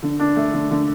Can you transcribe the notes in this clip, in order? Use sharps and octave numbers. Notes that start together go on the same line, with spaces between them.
D3
D4
A3
D3
D3